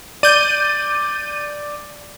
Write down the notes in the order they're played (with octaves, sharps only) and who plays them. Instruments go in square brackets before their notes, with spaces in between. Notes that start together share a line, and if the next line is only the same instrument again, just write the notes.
[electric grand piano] D5 [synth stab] G6 D#7